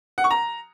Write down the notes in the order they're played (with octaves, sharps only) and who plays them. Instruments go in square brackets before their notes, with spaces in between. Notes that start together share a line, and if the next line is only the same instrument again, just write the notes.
[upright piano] F#5
C#6
A#5